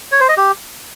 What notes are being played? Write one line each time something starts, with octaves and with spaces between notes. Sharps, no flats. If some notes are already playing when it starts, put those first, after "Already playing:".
C#5
C5
D#5
G4